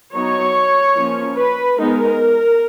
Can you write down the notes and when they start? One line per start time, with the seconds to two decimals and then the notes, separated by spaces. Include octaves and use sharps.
0.13 F#3 B3 D#4 C#5
0.95 F3 A#3 C#4
1.36 B4
1.77 G#3 B3 D#4 A#4